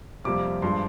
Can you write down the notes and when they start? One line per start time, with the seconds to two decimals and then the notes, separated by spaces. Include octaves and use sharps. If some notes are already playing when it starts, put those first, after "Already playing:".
0.24 F2 C3 G3 A#3 D6
0.62 G2 F3 G#3 C6